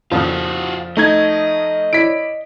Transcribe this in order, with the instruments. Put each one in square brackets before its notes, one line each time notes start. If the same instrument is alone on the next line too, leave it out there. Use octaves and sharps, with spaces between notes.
[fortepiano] F2 A#2 C#3 [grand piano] F3 [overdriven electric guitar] F4 F#4
[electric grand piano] A3 D#4 G#6 [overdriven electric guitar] D#5
[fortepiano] E4 C#5 D5 [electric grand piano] B6 D7